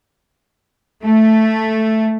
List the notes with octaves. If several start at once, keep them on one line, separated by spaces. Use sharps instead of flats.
A3